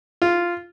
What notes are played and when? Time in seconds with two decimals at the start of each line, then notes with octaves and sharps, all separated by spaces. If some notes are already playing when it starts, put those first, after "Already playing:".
0.22 F4